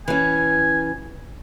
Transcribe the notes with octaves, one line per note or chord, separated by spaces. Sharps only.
E3 C#4 G#5